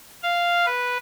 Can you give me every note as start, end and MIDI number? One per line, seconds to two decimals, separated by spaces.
0.23 0.65 77
0.66 0.97 71